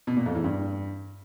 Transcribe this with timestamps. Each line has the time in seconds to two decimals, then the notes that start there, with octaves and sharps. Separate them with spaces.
0.07 B2
0.17 A#2
0.26 F2
0.35 E2
0.44 G2